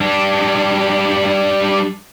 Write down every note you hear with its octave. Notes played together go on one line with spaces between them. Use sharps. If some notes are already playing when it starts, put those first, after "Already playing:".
G3 D4